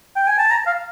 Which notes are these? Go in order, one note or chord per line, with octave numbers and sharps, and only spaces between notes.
G5
G#5
A5
A#5
F5